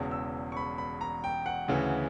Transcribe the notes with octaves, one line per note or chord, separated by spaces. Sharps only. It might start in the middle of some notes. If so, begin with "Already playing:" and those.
Already playing: E1 E2 C#3
E6
C#6
B5
B5
A#5
G5
F#5
D2 C#3 E3